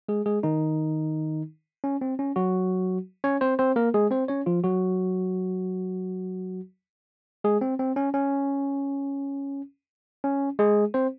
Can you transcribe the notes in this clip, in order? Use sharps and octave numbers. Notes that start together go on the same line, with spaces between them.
G#3 G#4
G#3 G#4
D#3 D#4
C#4
C4
C#4
F#3 F#4
C#4 C#5
C4 C5
C4 C5
A#3 A#4
G#3 G#4
C4 C5
C#4 C#5
F3 F4
F#3 F#4
G#3 G#4
C4
C4
C#4
C#4
C#4
G#3 G#4
C4 C5